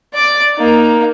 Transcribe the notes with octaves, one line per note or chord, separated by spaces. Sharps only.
D5 D6
A#3 D#4